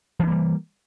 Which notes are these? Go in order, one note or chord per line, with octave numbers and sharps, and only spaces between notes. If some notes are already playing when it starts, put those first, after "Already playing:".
E3 G3 A#3 D4